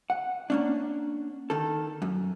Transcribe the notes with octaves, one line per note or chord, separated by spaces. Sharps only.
F#5
A#3 C#4 D4
D#3 A4
F#2